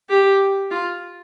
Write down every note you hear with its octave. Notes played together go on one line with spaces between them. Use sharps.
G4
F4